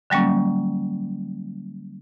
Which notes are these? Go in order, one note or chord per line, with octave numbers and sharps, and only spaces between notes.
D3 F#3 G3 A#3 C#4